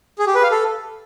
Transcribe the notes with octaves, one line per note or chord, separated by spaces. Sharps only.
G#4
G4
B4
F5
A4